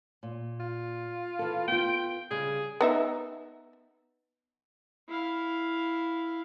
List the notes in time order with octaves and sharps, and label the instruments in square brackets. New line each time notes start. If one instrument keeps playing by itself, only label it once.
[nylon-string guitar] A#2
[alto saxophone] F4
[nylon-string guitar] E3 A4
[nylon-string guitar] B3 F4 [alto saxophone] G5
[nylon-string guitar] C#3 G3 [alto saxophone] G#4
[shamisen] B3 D#4 E5
[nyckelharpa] E4 F5